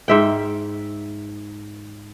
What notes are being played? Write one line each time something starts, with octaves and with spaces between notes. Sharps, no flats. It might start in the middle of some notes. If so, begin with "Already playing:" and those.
G#2 E5 G5